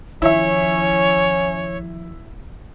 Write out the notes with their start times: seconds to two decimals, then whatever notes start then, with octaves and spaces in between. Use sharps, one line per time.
0.22 D#3 F3 C#4 E4 C#5 E5